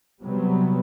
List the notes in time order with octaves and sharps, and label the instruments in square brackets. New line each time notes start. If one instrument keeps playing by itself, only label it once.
[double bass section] C3 F#3 G3 B3